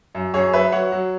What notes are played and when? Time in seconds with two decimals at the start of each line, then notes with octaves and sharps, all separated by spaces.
0.15 F#2
0.34 F#2 G#4 C#5
0.53 F#3 B4 E5
0.72 F#3 C#5 F#5
0.92 F#3